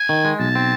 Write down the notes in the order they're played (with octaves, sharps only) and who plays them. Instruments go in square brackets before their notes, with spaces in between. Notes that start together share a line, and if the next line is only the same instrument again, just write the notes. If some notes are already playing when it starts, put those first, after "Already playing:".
Already playing: [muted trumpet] G#5
[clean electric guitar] D#3
G#3
[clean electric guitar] B1 [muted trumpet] A5
[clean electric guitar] C4